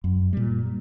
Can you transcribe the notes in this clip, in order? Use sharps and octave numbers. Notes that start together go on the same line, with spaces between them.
F#2
A#2 G3